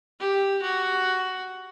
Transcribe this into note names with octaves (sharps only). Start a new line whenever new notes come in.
G4
F#4